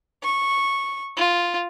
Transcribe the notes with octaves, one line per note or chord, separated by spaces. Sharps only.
C#6
F4